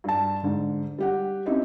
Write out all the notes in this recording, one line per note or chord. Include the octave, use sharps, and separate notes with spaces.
G2 A5
G#2 D3
G3 G4 F#5
C4 C#4 D#4 E4 G4